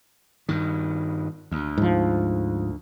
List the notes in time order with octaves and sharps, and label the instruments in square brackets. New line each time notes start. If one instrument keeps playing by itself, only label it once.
[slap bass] G2 D#3
D2
[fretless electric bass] G#2 F3